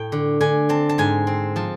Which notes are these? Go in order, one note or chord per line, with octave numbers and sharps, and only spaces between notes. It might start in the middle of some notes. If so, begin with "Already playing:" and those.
Already playing: A2 G5
D3
D3 G#5
C4 A5
A5
G#2 G#5
C4
F3 A5